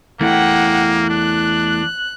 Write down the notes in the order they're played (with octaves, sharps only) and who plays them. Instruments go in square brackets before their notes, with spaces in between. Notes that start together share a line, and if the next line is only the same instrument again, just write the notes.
[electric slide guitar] E2 E3 A3 [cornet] A#3 [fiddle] F#5 G5
[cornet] D4 [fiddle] F#6